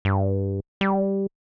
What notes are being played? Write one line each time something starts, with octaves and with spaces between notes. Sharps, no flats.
G2
G3